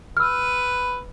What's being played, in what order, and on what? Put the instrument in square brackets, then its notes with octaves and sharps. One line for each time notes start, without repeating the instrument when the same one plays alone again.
[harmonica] B4 [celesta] E6 F6